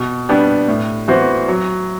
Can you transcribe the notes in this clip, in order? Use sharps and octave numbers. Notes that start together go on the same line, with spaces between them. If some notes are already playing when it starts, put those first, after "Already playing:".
Already playing: B2
G3 B3 D4 G4
A2
E3 B3 F#4 C5
F#3